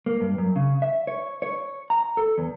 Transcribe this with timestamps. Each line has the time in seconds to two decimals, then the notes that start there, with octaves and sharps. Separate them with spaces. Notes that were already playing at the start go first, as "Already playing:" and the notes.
0.06 A#3
0.21 G2
0.38 F#2
0.56 C#3
0.82 E5
1.07 C#5
1.42 C#5
1.90 A#5
2.17 A4
2.38 E2